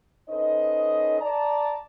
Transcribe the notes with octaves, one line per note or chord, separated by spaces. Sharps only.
C#4 D#4 A4 B4 C5 D#5
D5 A5 A#5